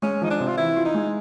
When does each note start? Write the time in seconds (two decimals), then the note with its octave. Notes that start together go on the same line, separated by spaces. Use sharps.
0.02 G#3 C#4
0.22 F3 D#4
0.31 D4
0.40 C3
0.48 F4
0.58 E3 E4
0.76 F4
0.85 D#4
0.94 G#3